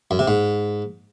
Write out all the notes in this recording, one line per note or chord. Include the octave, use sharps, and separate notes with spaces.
F#2
C3
G#2